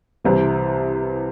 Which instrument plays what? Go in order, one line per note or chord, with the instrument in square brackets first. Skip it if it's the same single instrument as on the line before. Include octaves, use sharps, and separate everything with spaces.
[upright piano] C2 C3 E3